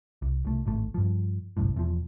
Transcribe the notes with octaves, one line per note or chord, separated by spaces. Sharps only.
C2
C2 A3
D1 G#1 A3
G2 F3
G1 C2 F#2 A2
E1 E2 F3